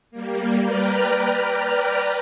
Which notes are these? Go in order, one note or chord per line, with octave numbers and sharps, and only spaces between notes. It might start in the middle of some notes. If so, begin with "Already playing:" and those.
G3 A#3
B4 D5 G5 A#5 F6